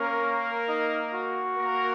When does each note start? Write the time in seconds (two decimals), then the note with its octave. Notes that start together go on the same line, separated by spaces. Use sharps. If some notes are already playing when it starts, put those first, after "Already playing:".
Already playing: A#3 C#4 A#4
0.69 D#4
1.13 F#4
1.57 A#3 A#4